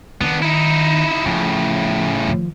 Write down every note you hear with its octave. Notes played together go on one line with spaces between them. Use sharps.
D#3 B3 D4
D#4 E4
A2 C#3 F3
D#3 F3